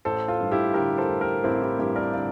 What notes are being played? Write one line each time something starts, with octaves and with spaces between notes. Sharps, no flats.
A1 A4 C5
F4 A4
G2
E4 G4
D3 G4 A#4
A4 C5
A1
G4 A#4
A1 C4 E4
E4 G4
G2 E4 G4
A#4 D5
D3 D5 F5